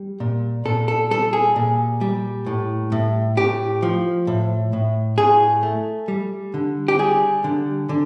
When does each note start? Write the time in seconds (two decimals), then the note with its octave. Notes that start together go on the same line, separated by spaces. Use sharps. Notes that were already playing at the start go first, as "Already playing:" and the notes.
Already playing: G3
0.20 A#2
0.65 A#2 A4
0.88 A4
1.11 G3 A4
1.33 G#4
1.56 A#2
2.01 G3
2.46 A2
2.92 A2
3.37 A2 G4
3.82 F3
4.27 A2
4.73 A2
5.18 A2 G#4
5.63 A3
6.08 G3
6.54 D3
6.88 G4
6.99 G3 G#4
7.44 D3
7.89 D3